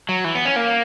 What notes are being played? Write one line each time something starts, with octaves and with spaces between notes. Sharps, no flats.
F#3
E3
B3
C#4
A#3